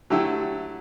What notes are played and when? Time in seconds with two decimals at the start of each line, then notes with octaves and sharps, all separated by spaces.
0.10 D3 F#3 A3 E4 G4